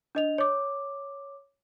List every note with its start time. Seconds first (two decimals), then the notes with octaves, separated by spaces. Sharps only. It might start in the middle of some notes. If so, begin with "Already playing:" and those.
0.15 D4 D#5 F7
0.38 C#5 D6